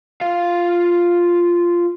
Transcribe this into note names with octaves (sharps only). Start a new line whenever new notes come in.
F4 F5